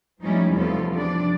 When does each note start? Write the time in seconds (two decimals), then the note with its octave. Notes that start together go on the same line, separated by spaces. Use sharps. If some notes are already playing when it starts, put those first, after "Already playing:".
0.21 F3 G3 A3 C#4 D#4 E4
0.53 E2 C3 F3 B3 F4 A4
0.91 F3 G3 D4 D5